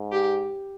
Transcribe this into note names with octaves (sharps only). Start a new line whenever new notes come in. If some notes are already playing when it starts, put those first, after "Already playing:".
Already playing: G#2
G4